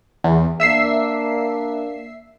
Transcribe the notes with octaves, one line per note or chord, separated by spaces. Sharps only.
E2
A#3 D4 E5 E6 C7